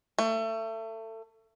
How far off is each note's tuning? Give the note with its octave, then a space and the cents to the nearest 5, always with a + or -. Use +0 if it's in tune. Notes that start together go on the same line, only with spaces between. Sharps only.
A3 +25